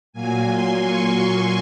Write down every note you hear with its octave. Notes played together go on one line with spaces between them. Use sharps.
A#2 F#3 A#3 G#5
C6
C#6